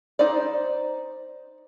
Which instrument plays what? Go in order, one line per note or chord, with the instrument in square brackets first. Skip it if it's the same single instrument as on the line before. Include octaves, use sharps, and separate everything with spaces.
[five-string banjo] D#4 C5 D5